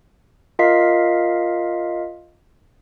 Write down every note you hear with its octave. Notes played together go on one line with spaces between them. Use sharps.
F4 A#4 D#5 F5 B6 C7